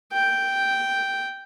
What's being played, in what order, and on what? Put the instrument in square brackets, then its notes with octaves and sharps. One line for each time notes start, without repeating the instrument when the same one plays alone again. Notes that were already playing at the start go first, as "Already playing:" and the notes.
[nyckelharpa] G5